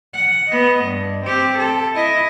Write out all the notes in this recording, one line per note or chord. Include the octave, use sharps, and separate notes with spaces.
F#5
B3 D#5
G2
C4 G4
A4
E4 D#5